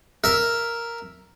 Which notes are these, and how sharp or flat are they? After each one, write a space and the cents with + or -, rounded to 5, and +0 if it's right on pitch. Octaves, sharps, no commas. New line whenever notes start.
A#4 +0 E5 +0